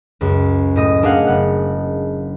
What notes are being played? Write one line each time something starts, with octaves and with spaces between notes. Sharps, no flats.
C#2 F#2
A2 D#5 D#6
A#3 D4 G#4 D#5 F5 F#5
F#1 F#5